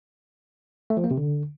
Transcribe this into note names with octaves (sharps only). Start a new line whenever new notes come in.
A3
F3
A#3
C3
D3